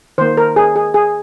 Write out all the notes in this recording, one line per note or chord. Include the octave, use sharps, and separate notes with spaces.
D#3 A#3 C5
A#4
G#4
G#4
G#4